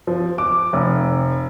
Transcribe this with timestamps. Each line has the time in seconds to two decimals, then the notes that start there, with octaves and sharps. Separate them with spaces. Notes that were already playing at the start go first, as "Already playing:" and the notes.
0.07 F3
0.38 D6
0.73 F1